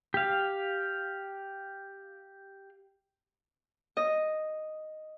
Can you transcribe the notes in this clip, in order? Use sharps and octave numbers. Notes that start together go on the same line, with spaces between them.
G4 F5
D#5